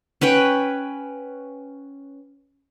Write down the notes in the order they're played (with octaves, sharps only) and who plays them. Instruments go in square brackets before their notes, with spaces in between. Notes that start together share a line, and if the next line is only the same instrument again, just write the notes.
[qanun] C#4 B4 F#5 G5